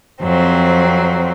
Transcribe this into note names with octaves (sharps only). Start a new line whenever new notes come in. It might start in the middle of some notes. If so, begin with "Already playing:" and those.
F2 F#3 C4